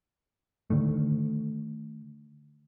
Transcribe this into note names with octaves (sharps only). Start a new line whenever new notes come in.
D3 D#3 A3